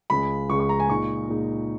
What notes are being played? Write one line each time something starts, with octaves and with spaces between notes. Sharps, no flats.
C#2 C#3 G#3 B5
C#2 C#3 G#3 C#6
C#6
A#5
G#5
A#2 G#3 D#4 C#6
A#2 G#3 D#4